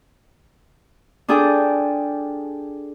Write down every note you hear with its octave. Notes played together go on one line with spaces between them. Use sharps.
D4 F4 G#4 A4 G5 D6